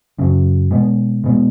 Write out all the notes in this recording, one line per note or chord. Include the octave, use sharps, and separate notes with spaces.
F#2 C#3 F#3
B2 G#3 B3
B2 G#3 B3